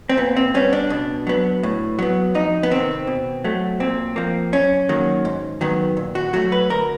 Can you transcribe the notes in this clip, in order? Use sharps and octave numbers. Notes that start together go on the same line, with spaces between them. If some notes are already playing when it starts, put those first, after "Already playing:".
C4
A#2 B3
C4
G3 B3 C#4
D4
B2
F#3 B3
A2
F#3 B3
F2 D#4
B3
C3 D#3 C4
B2
F#3 A3
A#2 C4
F3 A#3
F#2 C#4
D#3 F#3 A#3
G#2
D#3 F#3 B3
A#2
F#4
F#3 A3 F#4
B4
D2 A#4